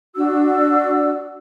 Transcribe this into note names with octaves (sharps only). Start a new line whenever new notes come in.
D4 F#4 E6